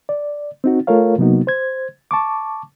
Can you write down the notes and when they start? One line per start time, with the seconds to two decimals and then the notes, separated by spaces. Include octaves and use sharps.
0.09 D5
0.64 C4 D#4 F#4
0.87 A3 F4 A4 A#4 C#5 F5
1.18 C3 F#3 A#3 B3 D#4 F#4
1.47 C5 G#6
2.11 A5 C#6 D6